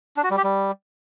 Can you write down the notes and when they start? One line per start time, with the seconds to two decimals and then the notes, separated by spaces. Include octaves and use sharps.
0.17 D4
0.24 F#4
0.30 G3
0.37 G4
0.44 G3